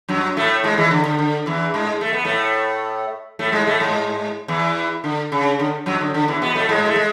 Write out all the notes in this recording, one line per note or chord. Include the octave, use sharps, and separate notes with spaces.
F#2 F#3
A2 A3
G#2 G#3
E2 E3
D3
D3
D3
E2 E3
G#2 G#3
A3
B3
A2 A3
A2 A3
G#2 G#3
A2 A3
G#2 G#3
E2 E3
D3
C#3
D3
F#2 F#3
D3
D3
E2 E3
B2 B3
A2 A3
G#2 G#3
A3
G#3